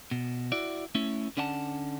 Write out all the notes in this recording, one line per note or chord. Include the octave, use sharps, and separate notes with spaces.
B2
E4 F#4 D5
A3 C#4 E4
D3 C#4 D5 F#5 G#5 A5